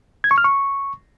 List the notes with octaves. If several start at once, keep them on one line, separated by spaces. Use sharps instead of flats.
G#6
C#6
F6
C#6